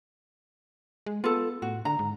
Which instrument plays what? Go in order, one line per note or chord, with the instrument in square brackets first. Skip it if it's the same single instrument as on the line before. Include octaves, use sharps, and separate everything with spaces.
[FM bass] G#3
[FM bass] B3 [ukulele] F4 A4
[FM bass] A2 [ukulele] F#4
[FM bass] D3 [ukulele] A#5
[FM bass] G#2